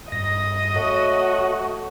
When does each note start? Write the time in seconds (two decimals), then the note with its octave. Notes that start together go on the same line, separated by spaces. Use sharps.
0.12 G2 D#5 A#6
0.75 A3 F#4 C#5 F#5